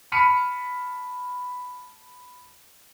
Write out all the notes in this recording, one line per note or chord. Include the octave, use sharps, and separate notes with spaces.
A5 B5 F6 B6 C#7 D#7